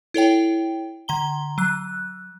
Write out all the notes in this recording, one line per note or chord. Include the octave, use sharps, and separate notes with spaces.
E4 A4 C#5 G5
D3 A#5 G7
F#3 F#6